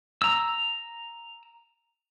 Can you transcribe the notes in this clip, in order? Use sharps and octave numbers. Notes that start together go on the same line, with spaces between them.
A#5 E6